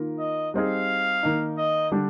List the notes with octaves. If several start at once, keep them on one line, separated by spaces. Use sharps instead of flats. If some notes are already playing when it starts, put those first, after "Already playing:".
Already playing: D#3 A#3 F4 A#4
D#5
G3 C4 D#4 G#4 F5
D#3 A#3 D#4
D#5
D3 G3 D4